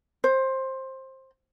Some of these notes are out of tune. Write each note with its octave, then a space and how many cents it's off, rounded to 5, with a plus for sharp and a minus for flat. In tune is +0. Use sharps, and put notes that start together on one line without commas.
C5 +15